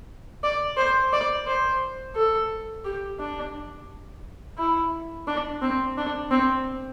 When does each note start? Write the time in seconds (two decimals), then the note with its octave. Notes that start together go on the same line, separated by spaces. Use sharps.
0.44 D5
0.77 C5
1.13 D5
1.47 C5
2.16 A4
2.85 G4
3.20 D4
4.58 E4
5.28 D4
5.62 C4
5.97 D4
6.31 C4